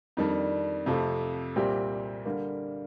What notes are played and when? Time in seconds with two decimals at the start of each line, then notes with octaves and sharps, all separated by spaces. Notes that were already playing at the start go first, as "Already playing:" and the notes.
0.17 F2 D#3 G3 D4
0.86 F2 C3 F3 A3
1.56 C2 A#2 G3 C4 G4
2.25 D3 G3 A#3